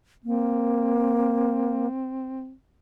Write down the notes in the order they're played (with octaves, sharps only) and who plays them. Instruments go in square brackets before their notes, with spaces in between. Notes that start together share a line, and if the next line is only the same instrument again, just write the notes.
[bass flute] A#3 [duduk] C4